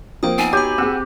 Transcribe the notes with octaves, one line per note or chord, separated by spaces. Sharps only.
F3 A#3 C4 G5 D#6
B3 D#4 G#5
F#4 G4 C#5 B5
C4 G#4 F#5 E6